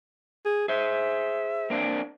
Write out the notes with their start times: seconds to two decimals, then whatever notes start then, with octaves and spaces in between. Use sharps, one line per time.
0.45 G#4
0.68 G#4 C5 E5
1.70 A#3 C4 D4